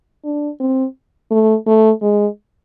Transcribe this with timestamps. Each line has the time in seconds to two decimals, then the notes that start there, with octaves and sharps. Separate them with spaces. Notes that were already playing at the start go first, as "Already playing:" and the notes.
0.25 D4
0.60 C4
1.31 A3
1.66 A3
2.02 G#3